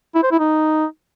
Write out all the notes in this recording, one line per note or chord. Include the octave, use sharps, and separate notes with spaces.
E4
C5
E4
D#4